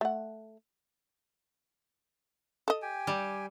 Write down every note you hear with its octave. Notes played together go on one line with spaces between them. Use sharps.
A3 F#5
A4 D#5
G4 G5 G#5
G3